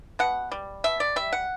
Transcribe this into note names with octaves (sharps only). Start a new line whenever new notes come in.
B2 F#5
G3
B2 E5
D5
G3 E5
F#5